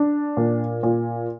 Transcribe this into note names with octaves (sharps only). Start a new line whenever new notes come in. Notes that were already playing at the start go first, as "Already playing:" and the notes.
Already playing: D4
A#2
A#2